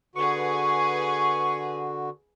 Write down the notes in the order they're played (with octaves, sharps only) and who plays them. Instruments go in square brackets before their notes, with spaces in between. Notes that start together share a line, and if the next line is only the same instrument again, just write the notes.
[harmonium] D3 F#4 [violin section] G#4 B4 [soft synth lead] C#6